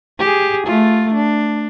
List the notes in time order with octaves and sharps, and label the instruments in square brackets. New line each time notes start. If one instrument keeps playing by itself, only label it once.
[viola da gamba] G4 G#4
A3 F4
D4